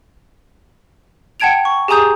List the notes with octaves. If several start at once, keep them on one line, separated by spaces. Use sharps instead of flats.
F#5 G5 A5 G#6 D7 F7
C#6
G4 G#4 G#5 A#5 D#6 G6